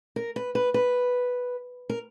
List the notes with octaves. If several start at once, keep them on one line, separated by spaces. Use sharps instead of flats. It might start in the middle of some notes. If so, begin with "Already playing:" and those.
A#4
B4
B4
B4
A#4